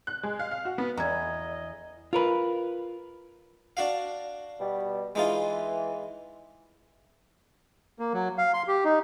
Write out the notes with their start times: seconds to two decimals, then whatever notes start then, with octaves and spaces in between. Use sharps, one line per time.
0.07 F#6
0.23 G#3
0.39 F5
0.51 F5
0.65 F#4
0.78 B3
0.97 E2 D#5 A#5 G#6
2.13 F4 A#4 B4
3.77 D4 F#4 F5
4.60 B2 G3
5.15 E3 G#3 D#4 F4
7.99 A#3
8.14 F#3
8.38 F5
8.54 C6
8.68 G4
8.84 D#4